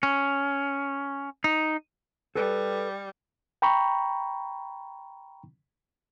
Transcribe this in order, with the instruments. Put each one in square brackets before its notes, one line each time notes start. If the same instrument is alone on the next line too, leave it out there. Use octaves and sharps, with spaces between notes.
[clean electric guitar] C#4
D#4
[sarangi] G3 [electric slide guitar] A4 B4
[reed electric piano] G5 A#5 B5 C#6